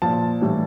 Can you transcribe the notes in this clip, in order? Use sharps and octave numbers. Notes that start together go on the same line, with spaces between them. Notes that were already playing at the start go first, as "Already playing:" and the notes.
A#2 F3 A5
A2 E3 G3